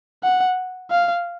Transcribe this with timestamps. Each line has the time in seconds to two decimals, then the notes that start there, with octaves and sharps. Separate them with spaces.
0.23 F#5
0.91 F5